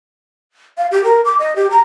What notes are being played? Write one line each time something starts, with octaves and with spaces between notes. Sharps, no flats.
F5
G4
A#4
D6
D#5
G4
A#5